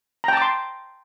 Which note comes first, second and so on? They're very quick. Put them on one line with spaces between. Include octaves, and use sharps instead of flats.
A#5 G5 A5 D6 C6